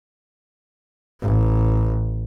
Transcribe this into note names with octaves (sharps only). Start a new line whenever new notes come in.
A1